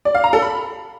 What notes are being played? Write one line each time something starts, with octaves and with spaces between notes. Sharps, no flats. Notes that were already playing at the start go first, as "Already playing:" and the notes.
D5
F5
A#5
A4
B5